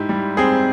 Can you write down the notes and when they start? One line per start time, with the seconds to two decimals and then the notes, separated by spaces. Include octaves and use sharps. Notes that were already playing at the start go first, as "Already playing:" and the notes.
Already playing: G#2 E4 G4
0.09 G3
0.37 C4 G#4